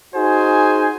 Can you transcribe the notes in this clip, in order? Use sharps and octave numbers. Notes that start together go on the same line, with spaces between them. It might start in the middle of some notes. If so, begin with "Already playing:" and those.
D#4 F#4 G#4 C5 G#5